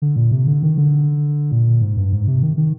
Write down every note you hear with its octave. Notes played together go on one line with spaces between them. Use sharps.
D3
A#2
C3
D3
D#3
D3
A#2
G#2
G2
G#2
C3
D#3
D#3